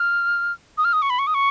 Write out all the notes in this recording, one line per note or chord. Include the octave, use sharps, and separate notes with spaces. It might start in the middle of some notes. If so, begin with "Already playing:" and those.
Already playing: F6
D#6
F6
D#6
C#6
B5
C#6
D#6
C#6